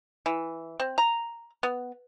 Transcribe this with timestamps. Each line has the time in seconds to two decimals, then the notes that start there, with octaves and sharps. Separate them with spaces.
0.26 E3
0.80 C4
0.98 A#5
1.63 B3